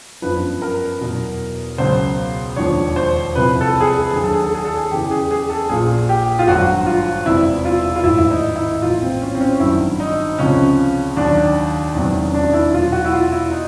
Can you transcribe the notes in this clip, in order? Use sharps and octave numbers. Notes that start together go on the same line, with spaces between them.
G1 F#2 D3 F3 B4
A#4
E2 B2 F#3
C#2 B2 F#3 C5
E1 D#2 D3 F3 C#5
C5
C2 C3 F3 B4
A4
G#4
A4
D#2 D3 F#3 G#4
A4
G#4
A4
G#4
A4
G#4
E2 C#3 E3 G4
G#4
G#4
A4
A#1 A#2 F3 G#4
G4
F4
G#1 G2 D3 F#3 F#4
F4
E1 E2 C3 E4
F4
F4
A1 G#2 D#3 E4
E4
D#4
E4
A#1 A2 E3 F4
C4
C#4
C4
C#4
G#1 G2 D#3 F#3 E4
D#4
C#2 C3 F3 C#4
D#2 D#3 F#3 D4
E1 E2 C3 D#3 F#3
C#4
D4
E4
E2 B2 F#3 F4
F#4
E4
F4
E4
D#4